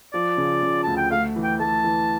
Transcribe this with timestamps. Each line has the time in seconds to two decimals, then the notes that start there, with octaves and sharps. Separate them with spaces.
0.13 F3 D5
0.37 C#3
0.62 C#3
0.83 D2 A5
0.97 G5
1.11 A3 F5
1.36 E3
1.44 G5
1.59 A3 A5
1.84 E3